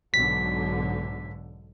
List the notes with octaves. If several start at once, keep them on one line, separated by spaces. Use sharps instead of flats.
B1 G#2 D3 B6